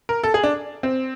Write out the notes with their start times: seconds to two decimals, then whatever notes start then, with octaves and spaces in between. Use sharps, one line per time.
0.09 A#4
0.24 A4
0.34 G#4
0.44 D4
0.83 C4